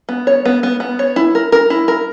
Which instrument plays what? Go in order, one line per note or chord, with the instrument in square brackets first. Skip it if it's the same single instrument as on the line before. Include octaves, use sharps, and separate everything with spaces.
[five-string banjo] B3
C#5
B3
B3
B3
C#5
E4
A#4
A#4
E4
A#4